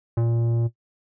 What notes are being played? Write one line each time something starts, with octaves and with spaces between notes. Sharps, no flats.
A#2